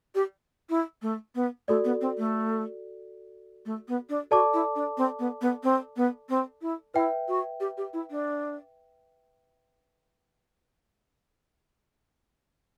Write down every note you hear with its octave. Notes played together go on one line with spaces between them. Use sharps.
G4
E4
A3
B3
A3 F#4 A4 D5
B3
C4
A3
A3
B3
D4
F#4 A4 D5 A5 D6
E4
D4
C4
B3
B3
C4
B3
C4
E4
E4 B4 E5 G5
F#4
G4
G4
E4
D4